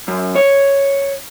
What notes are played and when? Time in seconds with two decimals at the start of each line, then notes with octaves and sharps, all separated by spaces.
0.08 F#2
0.36 C#5